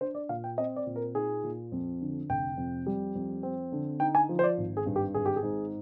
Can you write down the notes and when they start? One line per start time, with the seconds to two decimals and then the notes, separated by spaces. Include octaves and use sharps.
0.01 D4 C5
0.15 D5
0.29 A#2 F5
0.44 G5
0.57 C4 D#5
0.76 D5
0.86 A#2
0.96 A#4
1.15 D#4 G#4
1.43 A#2
1.72 F2
2.01 D3
2.29 F1 G5
2.57 F2
2.86 G3
3.15 F2
3.43 C4
3.72 D3
4.00 D#4 G5
4.15 G#5
4.29 F3
4.39 C5
4.43 D5
4.57 G#1
4.77 G#4
4.86 G2
4.96 G4
5.14 G#1 G#4
5.26 G4
5.36 G#4
5.43 G#2